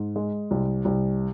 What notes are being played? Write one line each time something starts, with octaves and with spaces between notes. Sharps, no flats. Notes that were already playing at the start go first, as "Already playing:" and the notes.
Already playing: G#2
G#3
C2
C2